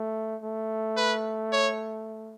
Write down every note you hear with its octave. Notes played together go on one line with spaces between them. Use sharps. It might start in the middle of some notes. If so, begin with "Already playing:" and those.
Already playing: A3
A3
B4
C#5